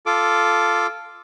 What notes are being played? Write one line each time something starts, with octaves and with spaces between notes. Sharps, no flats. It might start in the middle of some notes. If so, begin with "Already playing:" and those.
F4 A4 D6